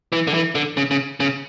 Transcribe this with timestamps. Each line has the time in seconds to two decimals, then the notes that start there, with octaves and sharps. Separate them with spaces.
0.12 E3
0.27 D3
0.34 E3
0.55 D3
0.77 C#3
0.91 C#3
1.20 C#3